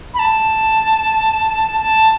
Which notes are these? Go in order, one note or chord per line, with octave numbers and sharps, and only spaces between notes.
B5
A5
A5